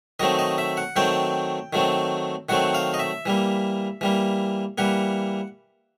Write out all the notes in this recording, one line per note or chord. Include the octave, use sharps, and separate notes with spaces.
D#3 F#3 A3 C4 D#5
D#5
E5
F#5
D#3 F#3 A3 C4 G5
D#3 F#3 A3 C4
D#3 F#3 A3 C4 F#5
F5
D#5
E5
E3 G3 A#3
E3 G3 A#3
E3 G3 A#3 F#5